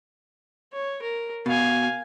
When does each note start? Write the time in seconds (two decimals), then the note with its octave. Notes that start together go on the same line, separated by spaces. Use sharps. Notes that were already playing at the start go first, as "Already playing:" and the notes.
0.73 C#5
1.02 A#4
1.46 B2 F5 G#5